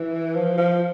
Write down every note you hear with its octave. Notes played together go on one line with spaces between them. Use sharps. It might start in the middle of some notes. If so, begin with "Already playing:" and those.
Already playing: E3
F3
F3